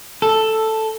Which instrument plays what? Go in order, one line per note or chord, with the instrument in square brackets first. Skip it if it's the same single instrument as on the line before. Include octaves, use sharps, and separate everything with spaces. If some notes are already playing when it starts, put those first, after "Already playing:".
[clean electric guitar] A4